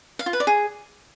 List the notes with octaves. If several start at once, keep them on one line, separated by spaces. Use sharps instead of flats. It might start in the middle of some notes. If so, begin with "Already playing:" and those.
F5
F4
B4
D5
G#4